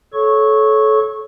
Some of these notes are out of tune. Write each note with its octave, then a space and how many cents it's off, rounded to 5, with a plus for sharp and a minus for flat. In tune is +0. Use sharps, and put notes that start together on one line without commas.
A4 -25 C#5 +0 C#6 -10